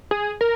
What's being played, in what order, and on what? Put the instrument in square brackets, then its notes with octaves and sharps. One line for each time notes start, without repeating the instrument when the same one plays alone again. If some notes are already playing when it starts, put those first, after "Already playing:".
[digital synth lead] G#4
A#4